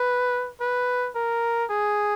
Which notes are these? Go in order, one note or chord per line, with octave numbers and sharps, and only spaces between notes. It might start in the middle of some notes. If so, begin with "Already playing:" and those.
Already playing: B4
B4
A#4
G#4